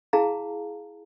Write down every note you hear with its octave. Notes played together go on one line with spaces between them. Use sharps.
E4 G#4 F5 A5 A#5